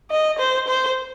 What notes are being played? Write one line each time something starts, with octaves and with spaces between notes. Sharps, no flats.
D#5
C5
C5